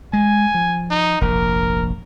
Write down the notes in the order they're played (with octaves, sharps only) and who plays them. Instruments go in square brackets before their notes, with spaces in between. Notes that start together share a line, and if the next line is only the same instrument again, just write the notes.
[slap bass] G#3 [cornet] G#5
[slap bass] F3
[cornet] D#4
[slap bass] F1 A#1 [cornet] A#4